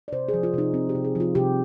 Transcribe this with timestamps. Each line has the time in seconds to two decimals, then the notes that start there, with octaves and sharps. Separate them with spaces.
0.08 D5
0.12 C3 C5
0.28 G#4
0.34 F3
0.43 F4
0.54 C3 D#4
0.74 C4 F4
0.89 G4
0.95 C3
1.05 G#4
1.15 F3 F4
1.35 C3 G4